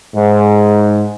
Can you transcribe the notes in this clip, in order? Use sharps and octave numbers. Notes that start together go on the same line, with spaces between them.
G#2